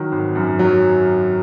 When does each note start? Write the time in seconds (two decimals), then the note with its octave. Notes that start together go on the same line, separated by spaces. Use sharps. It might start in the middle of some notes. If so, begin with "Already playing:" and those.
Already playing: D#3 F#3
0.12 G#1
0.35 F#2
0.59 F#3